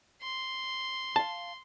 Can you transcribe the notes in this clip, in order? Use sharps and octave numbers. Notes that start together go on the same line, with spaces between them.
C6
F5 A5